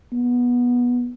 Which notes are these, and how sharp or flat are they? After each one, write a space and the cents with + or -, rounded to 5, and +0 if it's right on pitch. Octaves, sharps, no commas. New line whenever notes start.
B3 -15